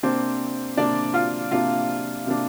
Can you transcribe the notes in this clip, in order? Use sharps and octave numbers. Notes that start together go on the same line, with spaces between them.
C3 A#3 C4 D4 C5
C3 A#3 D4 D5
F4 F5
C3 A#3 D4 F4 F5
C3 A#3 D4